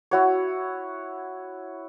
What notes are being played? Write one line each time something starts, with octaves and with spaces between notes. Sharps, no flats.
E4 F#4 C#5